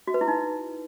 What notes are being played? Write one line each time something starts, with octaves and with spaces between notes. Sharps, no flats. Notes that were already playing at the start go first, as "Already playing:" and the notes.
F#4
B4
E4
D#4